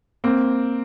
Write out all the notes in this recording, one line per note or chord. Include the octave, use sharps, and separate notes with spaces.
A#3 C4